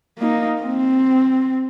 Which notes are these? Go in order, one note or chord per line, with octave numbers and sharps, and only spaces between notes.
A#3 D#4
C4